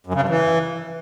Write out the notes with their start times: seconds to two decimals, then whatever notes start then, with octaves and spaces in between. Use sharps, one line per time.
0.07 F#2
0.14 C#3
0.21 G2
0.29 E3